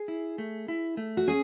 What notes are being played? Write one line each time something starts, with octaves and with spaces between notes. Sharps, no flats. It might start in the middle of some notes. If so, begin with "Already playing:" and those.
Already playing: G#4
E4
A3
E4
A3
F#4
C#4 G#4